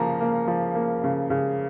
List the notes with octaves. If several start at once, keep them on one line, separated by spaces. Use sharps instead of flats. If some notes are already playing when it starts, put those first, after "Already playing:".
Already playing: C#3 F3 A#3 A#5
A#3
F3
A#3
C#3
C#3